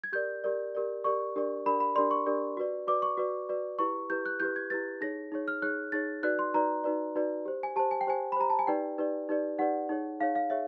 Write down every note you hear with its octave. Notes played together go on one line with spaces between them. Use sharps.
G#6
G4 A#4 D5 G6
G4 A#4 D5
G4 A#4 D5
G4 A#4 D5 C#6
D4 G4 A#4 D5
D4 G4 A#4 D5 B5
B5
D4 G4 A#4 D5 C6
C#6
D4 G4 A#4 D5
F#4 B4 D5
F#4 B4 D5 D6
C#6
F#4 B4 D5
F#4 B4 D5
E4 G4 B4 C#6
E4 G4 B4 G6
F#6
E4 G4 B4 G6
G#6
E4 G4 B4 A6
D#4 G#4 C#5 A#6
D#4 G#4 C#5
F6
D#4 G#4 C#5 F#6
D#4 G#4 C#5 A6
D#4 F#4 B4 D5 F#6
C6
D#4 F#4 B4 D5 A#5
D#4 F#4 B4 D5
D#4 F#4 B4 D5
G4 C5
G#5
G4 C5 A5
G#5
G5
G4 C5 G#5
B5
G4 C5 A#5
A5
G#5
D#4 G4 B4 D5 G5
D#4 G4 B4 D5
D#4 G4 B4 D5
D#4 G4 B4 D5 F#5
D#4 G#4 C#5
D#4 G#4 C#5 F5
F5
G#4 C#5 E5